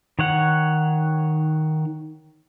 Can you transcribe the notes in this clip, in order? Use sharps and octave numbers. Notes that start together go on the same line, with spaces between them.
D#3 C#5 F#5